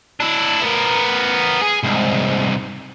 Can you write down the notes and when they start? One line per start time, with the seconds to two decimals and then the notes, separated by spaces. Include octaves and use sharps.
0.20 D4 E4
0.62 B3 A#4
1.62 G#4
1.83 C2 G#2